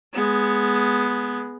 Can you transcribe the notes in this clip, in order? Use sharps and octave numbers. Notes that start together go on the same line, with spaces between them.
G#3 B3